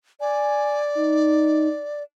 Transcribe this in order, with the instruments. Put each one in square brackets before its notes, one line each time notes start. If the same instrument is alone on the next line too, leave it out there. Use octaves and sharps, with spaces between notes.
[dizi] D5 [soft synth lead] G#5
[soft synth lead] D#4